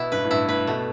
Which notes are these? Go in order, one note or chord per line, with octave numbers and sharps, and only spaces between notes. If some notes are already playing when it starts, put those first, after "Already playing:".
Already playing: B2 B3 E4
G2 B4
A2
G2 E4
A2 B4
B2 A3